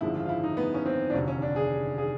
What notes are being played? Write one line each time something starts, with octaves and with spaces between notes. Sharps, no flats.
G#1 F#2 D3 F3 G#3 E4
F4
F4
E4
D#4
B3
C#4
C4
D4
F1 D#2 D3 F#3 C#4
C#4
D4
G#4
G#4